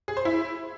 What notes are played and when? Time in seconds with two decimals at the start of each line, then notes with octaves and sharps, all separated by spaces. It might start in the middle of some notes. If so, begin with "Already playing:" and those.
0.08 G#4
0.17 C5
0.25 E4